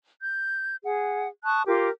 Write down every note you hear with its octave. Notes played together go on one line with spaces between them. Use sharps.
G6
G#4 F#5
A5 C#6 D#6 F#6
F4 G4 A#4 D6